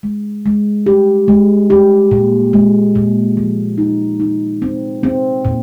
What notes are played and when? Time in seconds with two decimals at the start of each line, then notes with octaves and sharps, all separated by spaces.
0.03 G#3
0.46 G#3
0.86 G4
1.28 G#3
1.70 G4
2.11 A#2
2.53 G#3
2.95 A#2
3.37 F3
3.78 D#4
4.20 D#4
4.62 C4
5.03 C4
5.45 A#2